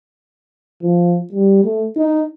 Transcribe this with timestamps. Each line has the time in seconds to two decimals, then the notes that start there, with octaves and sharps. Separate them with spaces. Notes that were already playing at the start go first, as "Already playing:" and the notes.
0.82 F3
1.33 G3
1.65 A3
1.97 D#4